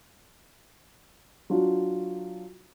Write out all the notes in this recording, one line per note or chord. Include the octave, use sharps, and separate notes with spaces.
F#3 D4 F4 F#4